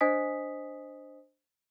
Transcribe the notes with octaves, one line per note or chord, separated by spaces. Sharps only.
D4 C5 D#5 G#5 D#6 B6